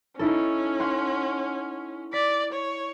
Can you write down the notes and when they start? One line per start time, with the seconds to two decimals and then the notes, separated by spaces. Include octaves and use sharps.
0.19 C#4 D#4 E4 A4
0.79 F#5 C6 C#7
2.13 D5 B6
2.52 C#5